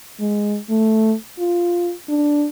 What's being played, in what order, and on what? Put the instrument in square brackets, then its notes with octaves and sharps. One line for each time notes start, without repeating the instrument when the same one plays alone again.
[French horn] G#3
A3
F4
D4